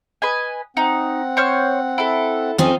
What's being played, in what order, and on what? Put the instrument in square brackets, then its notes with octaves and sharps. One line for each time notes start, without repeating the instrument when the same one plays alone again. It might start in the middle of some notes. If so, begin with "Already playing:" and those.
[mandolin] B4 D#5 G#5
[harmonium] C4 F#5 [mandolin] D#4
[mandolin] C5 C#5 F6
E4 A4
[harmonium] F2 C#4 [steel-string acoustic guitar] F3 C4 D#4 [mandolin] D#6